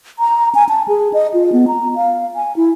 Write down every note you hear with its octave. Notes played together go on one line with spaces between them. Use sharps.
A#5
G#5
A5
G#4
D#5
F4
B3
A#5
F5
G#5
E4